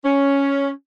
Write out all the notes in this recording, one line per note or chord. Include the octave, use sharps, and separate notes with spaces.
C#4